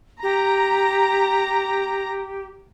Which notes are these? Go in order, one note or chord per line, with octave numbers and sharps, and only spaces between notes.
G4 A#5